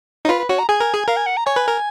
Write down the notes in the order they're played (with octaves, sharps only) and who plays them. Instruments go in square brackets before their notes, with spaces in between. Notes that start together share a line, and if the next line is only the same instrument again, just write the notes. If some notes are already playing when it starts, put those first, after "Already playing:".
[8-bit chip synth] D#4 [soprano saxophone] C#5
[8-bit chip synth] F4 [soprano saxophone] B4
[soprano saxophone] B4
[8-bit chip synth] F#4 [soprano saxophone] C#5
[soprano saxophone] A#5
[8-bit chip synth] G#4 [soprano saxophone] G#5
[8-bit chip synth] A#4
G#4
[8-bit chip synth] A#4 [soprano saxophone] F5
[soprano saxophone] G#5
F#5
A#5
[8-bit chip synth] C#5 [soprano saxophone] G#5
[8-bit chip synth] B4
A#4